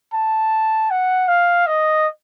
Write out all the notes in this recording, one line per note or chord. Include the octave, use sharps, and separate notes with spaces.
A5
F#5
F5
D#5